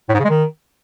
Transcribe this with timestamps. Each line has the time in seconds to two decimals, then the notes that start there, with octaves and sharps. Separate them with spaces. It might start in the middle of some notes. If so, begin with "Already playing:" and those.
0.09 A2
0.14 G#2
0.19 C#3
0.24 G#3
0.30 D#3